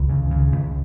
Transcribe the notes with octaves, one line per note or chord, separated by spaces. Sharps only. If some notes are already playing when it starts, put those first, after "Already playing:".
Already playing: C#2 D#3
C#3
C#3
C#2